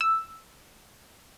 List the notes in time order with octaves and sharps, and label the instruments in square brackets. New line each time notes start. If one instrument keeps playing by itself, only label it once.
[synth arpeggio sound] E6